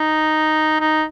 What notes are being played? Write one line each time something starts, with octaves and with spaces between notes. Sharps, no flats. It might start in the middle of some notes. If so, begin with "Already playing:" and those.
Already playing: D#4
D#4